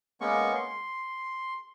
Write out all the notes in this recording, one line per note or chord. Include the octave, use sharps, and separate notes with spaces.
G#3 A#3 B3 C#4 C#6
C6